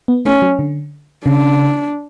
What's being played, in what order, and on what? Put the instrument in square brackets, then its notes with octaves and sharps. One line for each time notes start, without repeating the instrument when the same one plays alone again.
[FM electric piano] B3
[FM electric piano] A3 [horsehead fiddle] C#4
[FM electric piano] F#3
D3
[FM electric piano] C#3 [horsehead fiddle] D4